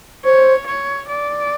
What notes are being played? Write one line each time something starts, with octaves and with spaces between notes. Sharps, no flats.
C5 C#5
C#5
D5